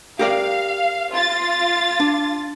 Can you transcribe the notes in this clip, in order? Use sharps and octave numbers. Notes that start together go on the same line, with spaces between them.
G4 A#4 D5 F5
F4 A6
D4